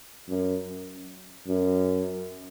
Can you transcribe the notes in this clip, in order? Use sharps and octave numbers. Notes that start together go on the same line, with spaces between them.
F#2
F#2